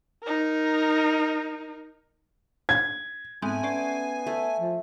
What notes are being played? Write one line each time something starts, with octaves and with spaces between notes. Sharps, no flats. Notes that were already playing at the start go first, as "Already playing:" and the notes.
D#4 A#4
G#6
G#2 G#3 A3 B3 C4 G#5
B3 C#4 D5 C7
A3
F3